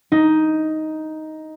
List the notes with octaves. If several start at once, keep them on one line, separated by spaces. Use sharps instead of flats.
D#4